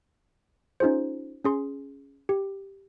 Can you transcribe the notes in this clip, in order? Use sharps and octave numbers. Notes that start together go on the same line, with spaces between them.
C#4 D#4 F4 G#4 C5
C#4 G#4 C6
G4